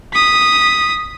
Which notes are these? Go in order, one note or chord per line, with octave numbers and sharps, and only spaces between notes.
D#6 B6